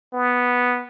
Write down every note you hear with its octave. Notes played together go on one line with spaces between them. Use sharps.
B3